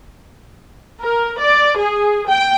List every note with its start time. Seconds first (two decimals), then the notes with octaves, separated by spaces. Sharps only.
0.99 A#4
1.38 D5
1.76 G#4
2.26 G5